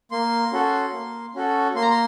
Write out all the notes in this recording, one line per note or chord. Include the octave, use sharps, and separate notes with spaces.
A#3 C6
C#4 F#4 A4
A#3
C#4 F#4 A4
A#3 C6
A#5
C6